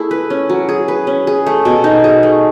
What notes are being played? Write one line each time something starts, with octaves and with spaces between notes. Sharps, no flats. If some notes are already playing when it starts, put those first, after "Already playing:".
Already playing: A3 E4 G#4
B4
C#4
F#3
G#4
B4
C#4
G#4
A3
B2
D#4
G#4
A3